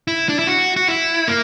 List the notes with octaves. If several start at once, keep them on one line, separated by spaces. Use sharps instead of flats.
E4
D4
E4
F#4
F#4
E4
A#3